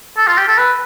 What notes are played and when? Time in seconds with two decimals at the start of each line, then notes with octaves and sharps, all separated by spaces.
0.18 A4
0.27 F4
0.37 G4
0.48 A4
0.58 B4